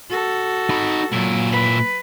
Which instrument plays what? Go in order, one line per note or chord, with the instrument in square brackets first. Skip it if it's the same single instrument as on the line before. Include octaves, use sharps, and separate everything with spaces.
[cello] F#4 A4
[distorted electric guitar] D#4 B5
[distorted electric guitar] A#2 E4 [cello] F#3
[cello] B4